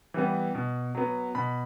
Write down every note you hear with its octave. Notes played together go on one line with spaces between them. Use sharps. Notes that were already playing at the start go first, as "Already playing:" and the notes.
E3 G3 B3
B2
F#3 B3
B2 B5